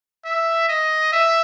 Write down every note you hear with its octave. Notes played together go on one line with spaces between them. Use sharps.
E5
D#5
E5